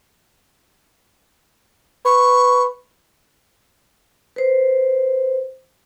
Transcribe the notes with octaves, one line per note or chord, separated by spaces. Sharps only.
B4 C#6
B4 C5